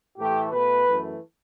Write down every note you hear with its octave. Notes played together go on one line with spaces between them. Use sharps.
A2 E3 A3 G4
B2 A3 B4
F#2 E3 A3